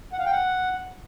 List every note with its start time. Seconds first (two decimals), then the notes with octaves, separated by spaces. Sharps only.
0.13 F#5
0.19 F5
0.25 G5
0.32 F#5